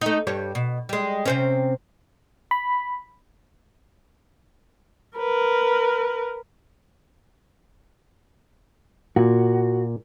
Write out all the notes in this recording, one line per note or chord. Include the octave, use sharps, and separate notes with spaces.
A3 D#4
G2 G3 C#5
B2
G3 G#3
C3 C4 C#4
B5
A#4 B4
A#2 F#4